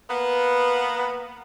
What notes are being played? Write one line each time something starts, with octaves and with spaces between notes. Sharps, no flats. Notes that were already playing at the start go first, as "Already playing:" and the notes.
A#3 B3